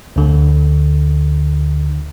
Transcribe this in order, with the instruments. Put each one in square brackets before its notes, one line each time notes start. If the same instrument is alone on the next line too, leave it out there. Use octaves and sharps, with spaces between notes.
[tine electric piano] D2 D3